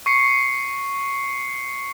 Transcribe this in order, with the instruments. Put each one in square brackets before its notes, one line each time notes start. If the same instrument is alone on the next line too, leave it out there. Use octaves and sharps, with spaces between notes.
[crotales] C#6 C7 C#7